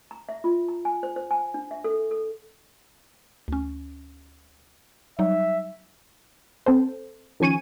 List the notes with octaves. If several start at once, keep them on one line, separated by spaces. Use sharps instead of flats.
A#5
E5
F4
A#5
G#5
C5
C5
G#5
D4
E5
A4
A4
D2 C#4
F#3 G3 D#4 E5
C4 A4 C5
D#3 F3 C#4 G#5 C#6 D#7